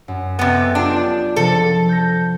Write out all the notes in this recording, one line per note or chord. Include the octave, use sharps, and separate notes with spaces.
F#2
C3 B3 A4
D4 F4 G4
C3 F3 A4
G6 A#6